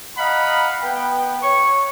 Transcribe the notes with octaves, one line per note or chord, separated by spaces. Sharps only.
D#5 F5 F#5 A#5 B5
B3 B4 G5
C#5 C#6